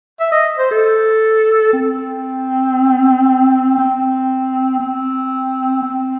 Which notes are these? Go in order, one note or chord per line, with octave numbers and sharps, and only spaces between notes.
E5
D#5
C5
A4
C4
C4
C4
C4